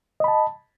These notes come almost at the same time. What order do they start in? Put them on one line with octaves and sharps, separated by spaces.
D#5 B5 A5